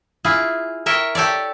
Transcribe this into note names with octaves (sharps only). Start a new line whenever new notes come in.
E4 F4 G#4
A#4 C#5 E5 G5
G4 A4 C#5 D5